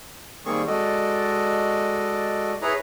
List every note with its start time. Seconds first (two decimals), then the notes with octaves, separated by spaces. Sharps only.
0.46 D#3 G3 A#3 C4 G#4 C#6
0.67 G#3 F#4 A4 D5 D#5
2.62 E4 G#4 B4 C#5 A#5